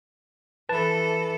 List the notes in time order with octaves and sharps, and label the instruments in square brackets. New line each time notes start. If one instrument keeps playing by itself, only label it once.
[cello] E3 A4 [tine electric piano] B4 A5